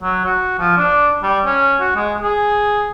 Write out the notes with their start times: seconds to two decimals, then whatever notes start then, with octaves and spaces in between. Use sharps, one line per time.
0.03 F#3
0.25 F#4
0.59 F3
0.78 D4
1.23 G3
1.45 C#4
1.80 F#4
1.96 G#3
2.22 G#4